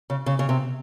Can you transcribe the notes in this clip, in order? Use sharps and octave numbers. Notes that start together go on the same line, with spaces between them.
C#3
C#3
C#3
C3